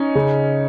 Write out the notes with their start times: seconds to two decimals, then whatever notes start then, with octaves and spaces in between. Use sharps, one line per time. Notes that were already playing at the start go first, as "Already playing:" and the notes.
Already playing: C#4 D#4
0.15 C#3